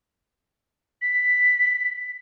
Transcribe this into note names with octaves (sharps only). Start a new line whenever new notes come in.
B6